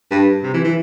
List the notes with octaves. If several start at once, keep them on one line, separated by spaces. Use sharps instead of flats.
G2
C3
E3
E3